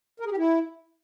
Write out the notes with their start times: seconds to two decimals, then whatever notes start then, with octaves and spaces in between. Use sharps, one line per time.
0.20 A#4
0.26 G#4
0.31 G4
0.37 E4